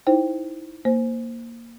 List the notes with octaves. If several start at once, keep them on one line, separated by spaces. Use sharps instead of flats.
D#4 E4 C5 G5
A#3 C5